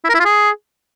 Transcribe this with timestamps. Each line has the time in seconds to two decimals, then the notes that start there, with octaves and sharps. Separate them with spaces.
0.04 E4
0.09 A#4
0.14 E4
0.20 F4
0.25 G#4